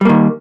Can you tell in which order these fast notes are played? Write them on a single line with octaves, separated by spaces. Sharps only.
G3 A#3 D#3